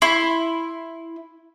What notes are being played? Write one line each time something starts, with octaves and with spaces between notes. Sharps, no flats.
E4 C6